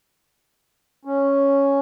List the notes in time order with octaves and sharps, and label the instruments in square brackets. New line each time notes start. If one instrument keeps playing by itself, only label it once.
[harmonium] C#4